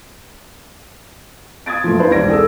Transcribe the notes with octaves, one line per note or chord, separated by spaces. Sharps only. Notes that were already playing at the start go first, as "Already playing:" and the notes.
D#6 G#6 A6 D7
F#2 A2 F3
D#4 E4 B4 C5
E1 C2 D5 G#6 A#6 D7
G#4 A4 E6